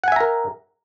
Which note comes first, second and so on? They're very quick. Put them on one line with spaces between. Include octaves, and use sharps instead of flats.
F#5 G#5 E5 A#5 A#4